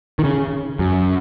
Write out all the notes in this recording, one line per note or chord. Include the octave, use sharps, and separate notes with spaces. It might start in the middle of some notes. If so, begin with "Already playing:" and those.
D#3
C#3
F#2